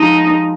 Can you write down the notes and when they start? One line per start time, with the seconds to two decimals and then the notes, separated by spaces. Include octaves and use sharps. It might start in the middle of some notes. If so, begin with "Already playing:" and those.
Already playing: F3 G#3 D#4 F#4